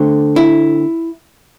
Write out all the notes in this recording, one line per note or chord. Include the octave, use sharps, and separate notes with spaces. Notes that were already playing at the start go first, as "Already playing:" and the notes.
Already playing: D3 A3 C4
E4